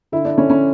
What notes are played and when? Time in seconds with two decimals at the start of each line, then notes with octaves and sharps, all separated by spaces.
0.12 D3 E4
0.25 D4
0.38 D3 C#4
0.50 C#4